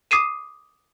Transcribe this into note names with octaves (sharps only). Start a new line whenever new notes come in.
D6 D#6 C7 D#7 E7